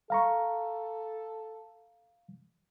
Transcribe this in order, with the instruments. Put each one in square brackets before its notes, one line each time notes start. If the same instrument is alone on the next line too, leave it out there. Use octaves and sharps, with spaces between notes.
[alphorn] A4 [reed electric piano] F5 A#5 C#6